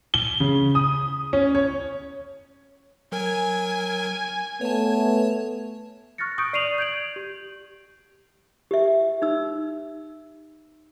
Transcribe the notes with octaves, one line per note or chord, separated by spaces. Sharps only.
G7
C#3
D#6
C#4
C#5
F#3 A#4 G#5
A3 B3 C#5 A5
C#6 F6 F#6 A6 A#6 C#7
C#6 D#6 G6 C#7 D7
D5 C7 D#7 F7 F#7
G6 G#6 D7 F#7
G4
G4 E5
D#4 E6